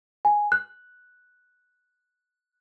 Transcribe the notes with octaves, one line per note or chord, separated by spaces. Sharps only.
G#5
F#6